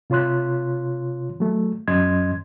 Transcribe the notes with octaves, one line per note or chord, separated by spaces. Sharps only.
C3 F4 C#5 C6 F#6
F#3 A3
F#2 F#3 C#4 D#5 C6 G#6